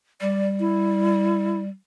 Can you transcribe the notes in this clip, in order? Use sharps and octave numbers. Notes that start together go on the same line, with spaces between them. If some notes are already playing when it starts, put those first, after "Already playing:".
G3 D5
E4